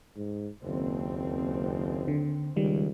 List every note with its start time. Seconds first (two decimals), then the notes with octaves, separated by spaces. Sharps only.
0.16 G#2
0.64 F#1 D#2 C4
2.08 D3
2.57 C#2 D#3 G3